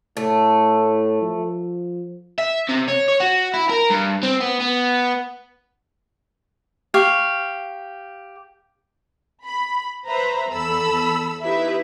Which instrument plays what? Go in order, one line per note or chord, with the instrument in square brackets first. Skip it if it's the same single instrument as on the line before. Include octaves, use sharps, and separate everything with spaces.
[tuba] A2 [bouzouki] A3
[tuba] F3
[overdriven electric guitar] E5
C3
C#5
C#5
F#4
E4
A#4
G2
C4
B3
B3
[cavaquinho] G4 F5 C#6
[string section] B5
B4 C5 E5 A#5 B5
E2 A4 B5 E6
D#4 E4 G4 B4 E5